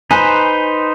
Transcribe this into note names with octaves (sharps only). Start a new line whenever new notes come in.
D#4 B4 C5 G#5